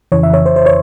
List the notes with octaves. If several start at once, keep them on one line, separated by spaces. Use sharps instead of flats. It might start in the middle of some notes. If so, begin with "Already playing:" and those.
F2 C#3 E3 C#5
E5
C#5
C5
C5
C#5